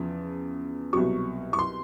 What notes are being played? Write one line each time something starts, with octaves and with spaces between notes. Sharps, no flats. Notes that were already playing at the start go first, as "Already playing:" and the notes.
Already playing: E2 C#3 F3
C2 B2 F#3 C#6
C#6
C6